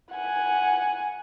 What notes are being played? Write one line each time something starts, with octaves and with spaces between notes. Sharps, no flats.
F#5 G#5